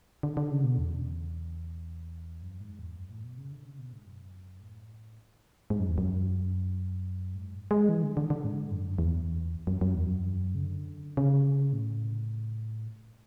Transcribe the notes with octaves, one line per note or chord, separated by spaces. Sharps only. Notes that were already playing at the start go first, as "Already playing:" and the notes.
D3
D3
C#3
B2
E2
F#2
G#2
E2
F#2
A2
B2
C#3
D3
C#3
B2
G#2
F#2
A2
G#2
F#2
E2
F#2
G#2
G#3
E3
D3
D3
D3
G#2
F#2
E2
F#2
F#2
E2
F#2
C#3
D3
C#3
A2